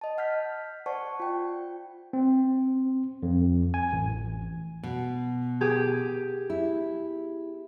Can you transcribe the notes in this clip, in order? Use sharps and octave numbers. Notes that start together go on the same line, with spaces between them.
D#5 A5
F#5 F6 G6 B6
C5 D5 F#5 A5 C#6
F4 G5
C4
F2
G#5
A1
B2
G4 G#4
E4